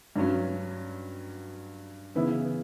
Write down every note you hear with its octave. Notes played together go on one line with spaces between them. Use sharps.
G2 F#3 C#4
C#3 E3 B3 E4